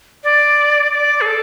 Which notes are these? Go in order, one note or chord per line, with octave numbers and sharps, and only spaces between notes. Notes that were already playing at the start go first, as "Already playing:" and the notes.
D5
D5
G#4
A4